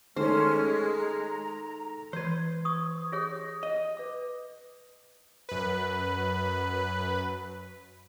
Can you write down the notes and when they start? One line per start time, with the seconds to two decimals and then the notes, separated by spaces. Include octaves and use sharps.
0.16 D#3 G#3 A3 C#4 C5 F6
0.94 A#5
2.13 E3 B4 C5 G#6
2.65 C#6 D#6
3.12 G4 G#4 C#5 D#6 A#6
3.63 D#5
3.97 B4 D6
5.49 F#2 B4